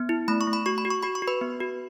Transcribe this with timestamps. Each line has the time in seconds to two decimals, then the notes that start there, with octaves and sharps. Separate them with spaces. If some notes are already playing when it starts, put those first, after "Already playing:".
Already playing: B3
0.09 E4
0.28 A3 B5
0.41 C#6
0.47 A3
0.53 B5
0.66 F#4 C#6
0.78 B5
0.85 F#4
0.90 C#6
1.03 F#4 B5
1.15 C#6
1.22 F#4
1.28 B4 B5
1.41 B3
1.60 F#4